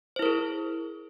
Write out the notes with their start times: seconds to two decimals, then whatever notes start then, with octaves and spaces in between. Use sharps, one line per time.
0.16 C5
0.19 E4
0.22 A#4
0.26 G#4